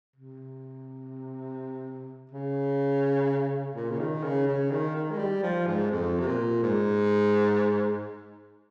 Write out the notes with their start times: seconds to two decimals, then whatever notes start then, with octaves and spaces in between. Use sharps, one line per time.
0.16 C3
2.31 C#3
3.75 A#2
3.91 C#3
4.00 D#3
4.23 C#3
4.47 C#3
4.71 D#3
4.95 D#3
5.11 G#3
5.19 G3
5.43 F3
5.67 G#2
5.91 F2
6.20 C3
6.27 A#2
6.63 G#2